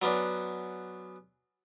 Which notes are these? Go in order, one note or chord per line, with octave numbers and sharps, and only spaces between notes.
F#3 B3 C#4 D4